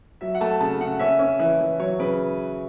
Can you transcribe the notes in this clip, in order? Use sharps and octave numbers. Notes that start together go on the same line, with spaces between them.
F#3 E5
F#5
A3 A5
C#3 A5
C#3 F#5
C#4 E5
C#4
E3
E3
F#3 C#5
C#3 B4